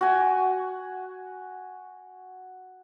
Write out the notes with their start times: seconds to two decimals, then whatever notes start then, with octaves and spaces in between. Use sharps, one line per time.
0.01 F#4 G#5